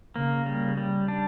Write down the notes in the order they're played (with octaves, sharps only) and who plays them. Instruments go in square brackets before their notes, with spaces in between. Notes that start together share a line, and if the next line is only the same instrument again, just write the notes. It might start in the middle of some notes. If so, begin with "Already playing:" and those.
[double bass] C#3 [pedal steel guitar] A#3
[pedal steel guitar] G3
G3
D4